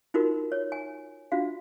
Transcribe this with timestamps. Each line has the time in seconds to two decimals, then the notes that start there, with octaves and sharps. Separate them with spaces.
0.14 D#4 F4 F#4 A#4
0.52 C#5
0.72 G#5
1.32 D4 F4 F#4 F5